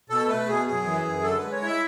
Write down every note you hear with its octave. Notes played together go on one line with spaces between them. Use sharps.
B2 A4
A3 B4
B2 G#4
F#2 G#4
E3
F#2
D3 A4
G#3 B4
C#5
E4
E5